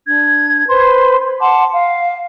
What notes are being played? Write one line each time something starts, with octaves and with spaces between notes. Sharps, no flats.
D4 G#6
B4 C5 C6
F#5 A5 C6 D6
F5